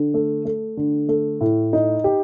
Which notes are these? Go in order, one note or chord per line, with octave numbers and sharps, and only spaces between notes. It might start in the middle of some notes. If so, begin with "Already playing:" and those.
Already playing: D3
A3
A3
D3
A3
A2
D#4
G4